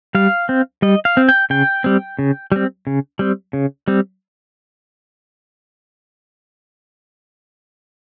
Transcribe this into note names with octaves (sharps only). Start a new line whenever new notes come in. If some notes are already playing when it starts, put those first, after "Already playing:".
G3 F5
C4
G3 D#5
F5
C4
G5
C#3 G5
G3 C4
C#3
G3 C4
C#3
G3 C4
C#3
G3 C4